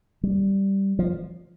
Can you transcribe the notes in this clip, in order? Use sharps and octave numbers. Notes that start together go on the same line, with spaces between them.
G3
F3